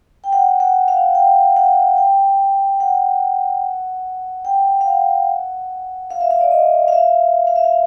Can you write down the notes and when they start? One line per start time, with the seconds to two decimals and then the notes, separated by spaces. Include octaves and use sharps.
0.24 G5
0.33 F#5
0.60 F#5
0.88 F5
1.15 G5
1.57 F#5
1.98 G5
2.80 F#5
4.45 G5
4.81 F5
4.86 F#5
6.11 F5
6.21 E5
6.30 F5
6.41 D5
6.51 D#5
6.88 F5
6.92 E5
7.47 F5
7.56 E5
7.64 F5